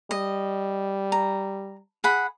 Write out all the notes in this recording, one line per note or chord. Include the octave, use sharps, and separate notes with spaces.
G3 D#5
A#5
G#4 F#5 B5